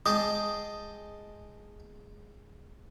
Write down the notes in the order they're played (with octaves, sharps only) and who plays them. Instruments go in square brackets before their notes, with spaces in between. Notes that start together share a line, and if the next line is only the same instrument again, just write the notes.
[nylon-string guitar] G#3 [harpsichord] D#5 G5 A5 [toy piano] D#6